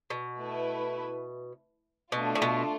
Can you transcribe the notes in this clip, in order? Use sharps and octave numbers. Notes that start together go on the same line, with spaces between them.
B2
A3 E4 B4
B2 A3 D4 F4
A2
B2